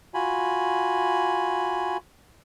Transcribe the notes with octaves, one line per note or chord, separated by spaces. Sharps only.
F4 F#4 G#5 B5